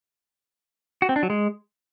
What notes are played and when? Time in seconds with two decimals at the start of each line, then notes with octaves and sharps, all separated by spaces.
1.02 F#4
1.09 C4
1.16 D4
1.23 F#3
1.30 G#3